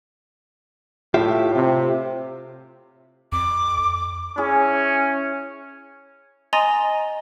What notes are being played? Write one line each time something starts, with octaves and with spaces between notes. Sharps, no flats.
A2 F4 G4 E5
C3
F2 D6
C#4 E4 G#4
D#5 G#5 A#5 C6 D#6 A6